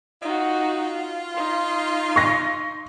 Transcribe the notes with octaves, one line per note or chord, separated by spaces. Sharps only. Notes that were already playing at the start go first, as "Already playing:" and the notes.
D#4 F4 F#4
D#4 C6
C#6 A#6